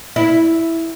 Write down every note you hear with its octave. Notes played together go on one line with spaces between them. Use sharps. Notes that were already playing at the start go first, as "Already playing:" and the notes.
E4